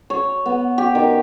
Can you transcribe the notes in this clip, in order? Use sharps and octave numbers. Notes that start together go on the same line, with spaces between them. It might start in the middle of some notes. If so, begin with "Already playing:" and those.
C#5
B3
G4
D#3